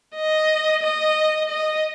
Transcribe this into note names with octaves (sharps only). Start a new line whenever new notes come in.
D#5
D#5
D#5